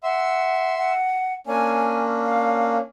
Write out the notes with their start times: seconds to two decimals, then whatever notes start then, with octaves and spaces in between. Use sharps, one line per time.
0.03 E5 F#5 C6 E6
0.78 F#5
1.47 A#3 C#4 D4 G#5
2.24 F5